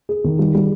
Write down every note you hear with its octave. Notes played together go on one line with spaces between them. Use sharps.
G#4
D#3
G3
G3